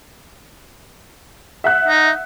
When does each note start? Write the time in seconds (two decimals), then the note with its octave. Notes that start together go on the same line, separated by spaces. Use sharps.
1.64 E5 F#5 F#6
1.88 D#4